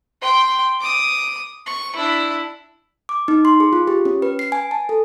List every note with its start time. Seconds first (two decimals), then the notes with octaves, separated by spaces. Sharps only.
0.21 G5 C6
0.81 D6 D#6
1.66 C#6
1.96 D4 E4
3.09 D6
3.28 D#4
3.45 C6
3.60 G#4
3.73 F4
3.88 G4
4.05 C#4
4.22 B4
4.39 C7
4.52 G#5
4.71 A5
4.89 A4